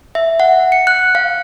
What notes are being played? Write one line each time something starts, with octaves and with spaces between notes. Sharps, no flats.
E5
F#5
C#7
F#6
F5